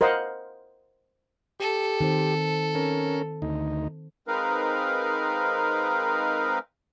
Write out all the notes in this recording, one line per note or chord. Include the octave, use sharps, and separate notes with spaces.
A#4 C5 D#5 F5 F#5
G4 A4
D#3 C4 C5
C#4 A#4
D2 D#4
G#3 C4 D#4 A#4 B4 F5